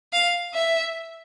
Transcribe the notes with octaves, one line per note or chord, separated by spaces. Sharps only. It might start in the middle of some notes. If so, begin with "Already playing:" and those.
F5
E5